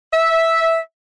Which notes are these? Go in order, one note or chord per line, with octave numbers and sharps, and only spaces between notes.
E5